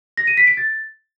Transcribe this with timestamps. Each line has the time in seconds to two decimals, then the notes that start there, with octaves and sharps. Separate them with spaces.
0.17 A#6
0.27 D#7
0.37 B6
0.47 D7
0.57 A6